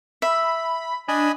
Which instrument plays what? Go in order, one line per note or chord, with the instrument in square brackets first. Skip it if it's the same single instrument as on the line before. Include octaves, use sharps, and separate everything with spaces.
[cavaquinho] E5 [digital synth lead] B5
[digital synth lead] D4 [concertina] D#5 G#5 B5